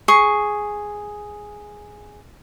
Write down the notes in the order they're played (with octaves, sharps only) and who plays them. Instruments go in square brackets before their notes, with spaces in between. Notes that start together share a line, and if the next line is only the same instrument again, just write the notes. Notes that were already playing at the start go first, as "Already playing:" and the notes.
[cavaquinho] G#4 C#6